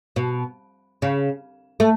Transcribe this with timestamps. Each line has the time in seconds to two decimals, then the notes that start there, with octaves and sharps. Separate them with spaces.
0.16 B2
1.02 C#3
1.80 A3